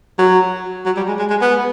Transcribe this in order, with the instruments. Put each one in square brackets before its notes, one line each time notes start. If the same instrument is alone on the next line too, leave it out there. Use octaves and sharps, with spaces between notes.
[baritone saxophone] F#3
F#3
G3
G#3
G#3
G#3
B3